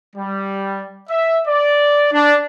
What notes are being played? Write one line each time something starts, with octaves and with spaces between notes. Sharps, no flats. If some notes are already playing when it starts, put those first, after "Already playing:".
G3
E5
D5
D4